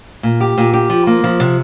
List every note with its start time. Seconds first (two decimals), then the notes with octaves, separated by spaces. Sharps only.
0.23 A#2
0.41 G4
0.58 A#2
0.73 G4
0.90 F3
1.07 A#3
1.24 F3
1.40 C3